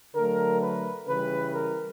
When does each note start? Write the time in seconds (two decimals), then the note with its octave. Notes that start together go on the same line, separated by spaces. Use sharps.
0.15 D3 F#3 A3 A#4
0.62 B4
1.08 C#3 E3 G3 B4
1.54 A#4